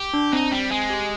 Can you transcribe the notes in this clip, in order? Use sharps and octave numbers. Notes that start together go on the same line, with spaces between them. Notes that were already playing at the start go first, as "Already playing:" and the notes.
Already playing: G4
D4
C4 D#4
G3 C4
G#3 G#5
G4